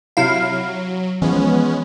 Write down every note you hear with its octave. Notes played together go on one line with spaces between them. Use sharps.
C3 F#3 E4 F5
E3 F3 G#3 B3 C#4